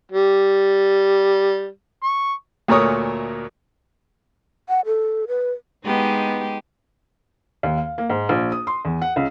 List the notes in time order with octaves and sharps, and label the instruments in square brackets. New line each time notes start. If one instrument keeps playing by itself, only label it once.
[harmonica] G3
C#6
[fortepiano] D2 A#2 A3 A#4 C#5 D#6
[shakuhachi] F#5
A4
B4
[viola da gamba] G#3 D#4 G4 [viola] B3
[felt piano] D#2
F5
A#3
G#2
A#1
D#6
C6
E2
F#5
C#2